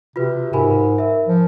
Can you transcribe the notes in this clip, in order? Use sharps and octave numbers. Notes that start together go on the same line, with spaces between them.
C3 F4 F#4 B4
G#2 A#4 G#5 B5
A#4 E5
F3